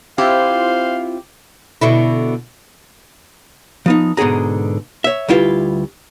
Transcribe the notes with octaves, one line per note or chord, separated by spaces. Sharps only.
C4 E4 F4 G4 C5 F5
B2 D3 E4
F3 B3 D#4
G#2 B2 D3 G#4 A#5
C#5 E5
D2 G3 E4 F4 B4